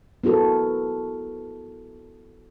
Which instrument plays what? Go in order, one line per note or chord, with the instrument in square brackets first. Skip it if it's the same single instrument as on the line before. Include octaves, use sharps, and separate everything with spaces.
[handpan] B3 E4 F#4 A4 A#4